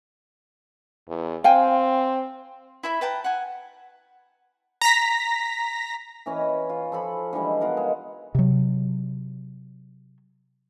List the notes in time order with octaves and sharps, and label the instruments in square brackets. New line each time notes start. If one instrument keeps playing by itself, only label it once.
[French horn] E2
[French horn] C4 [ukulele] F5 G5 G#5
[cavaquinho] E4 E5 B5
B4 G5 A5 A#5
F#5 G#5
[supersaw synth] A#5 A#6 B6
[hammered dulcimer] E3 C#4 D#5
F4
F3 A4 B5
D3 E3 G3 G#3
B3 F4 A#4 F#5
G#3
[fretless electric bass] C3 F#3